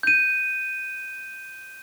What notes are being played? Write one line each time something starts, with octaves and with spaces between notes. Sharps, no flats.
G6 D#7